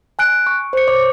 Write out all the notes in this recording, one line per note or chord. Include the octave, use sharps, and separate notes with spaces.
G#5 F#6 D7
C#6
C5 C#7
C#5 C#6 D6